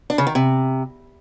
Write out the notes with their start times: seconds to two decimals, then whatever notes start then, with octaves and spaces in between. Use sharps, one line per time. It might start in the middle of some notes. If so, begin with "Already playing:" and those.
0.10 D4
0.18 C#3
0.27 D#3
0.35 C3